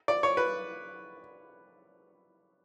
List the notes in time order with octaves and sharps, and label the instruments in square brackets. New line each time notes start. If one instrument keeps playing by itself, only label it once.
[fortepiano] D5
C#5
B4